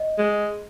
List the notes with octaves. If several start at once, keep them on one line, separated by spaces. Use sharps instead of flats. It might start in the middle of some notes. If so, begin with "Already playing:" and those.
Already playing: D#5
G#3